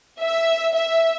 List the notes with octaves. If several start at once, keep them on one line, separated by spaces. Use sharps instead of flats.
E5
E5